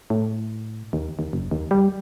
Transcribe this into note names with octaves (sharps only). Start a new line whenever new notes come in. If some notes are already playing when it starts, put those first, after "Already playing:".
A2
D#2
D#2
F#1
D#2
G3